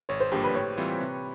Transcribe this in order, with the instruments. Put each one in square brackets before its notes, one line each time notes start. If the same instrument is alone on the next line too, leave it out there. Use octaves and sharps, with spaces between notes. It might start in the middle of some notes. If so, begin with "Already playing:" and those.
[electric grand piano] G#1 [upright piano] C#5
[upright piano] C5
[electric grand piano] G2 D3 F3 A#3 [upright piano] G4
[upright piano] B4
[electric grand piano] A2 [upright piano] C#5
[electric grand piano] E3 G3 C4 F4
C3